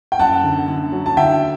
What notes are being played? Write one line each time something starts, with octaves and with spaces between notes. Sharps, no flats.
G5
F#2 F#5 A5
D3
D3
F#3
A5
D3 E5 G5